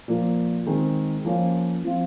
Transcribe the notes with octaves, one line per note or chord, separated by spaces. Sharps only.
A#2 F3 A#3
D#3 G#3 C4
F3 A#3 C#4 F4
F3 C4 F4